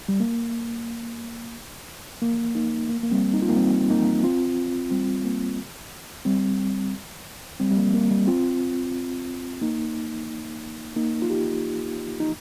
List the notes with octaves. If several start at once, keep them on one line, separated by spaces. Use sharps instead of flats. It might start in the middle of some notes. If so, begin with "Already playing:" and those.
G3
A#3
A#3
A#3 D#4
A#3
A#3
G3 C4
D#4
F4
A#3 D#4
G3 C4
A#3 D#4
C4 F4
G3 C4
A#3
G3 C4
G3 C4
G3
A#3
A#3
G3
C4 F4
A#3 D#4
A#3 D#4
F4
D#4 G4
D#4